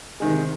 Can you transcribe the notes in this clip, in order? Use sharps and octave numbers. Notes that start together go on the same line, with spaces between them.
C3 D#3 G#3